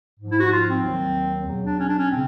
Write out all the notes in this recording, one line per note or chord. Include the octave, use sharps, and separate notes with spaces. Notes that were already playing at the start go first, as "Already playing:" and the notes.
G#2 F3
E4
F#4
F4
C4
D#2 D#3 F#3
E2 B2 F#3
D4
C#4
D4
C#4
C#3 C4